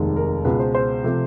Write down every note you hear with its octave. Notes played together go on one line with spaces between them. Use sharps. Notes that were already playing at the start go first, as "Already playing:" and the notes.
Already playing: F1 D#2 D#3 G#3
A#4
C#2 B2 G#3 B4
C5
C5
C3 F3 A3